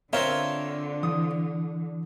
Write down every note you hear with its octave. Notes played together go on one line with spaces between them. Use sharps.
D3 C4 F4 A#4 C#5 E5
E3 D#6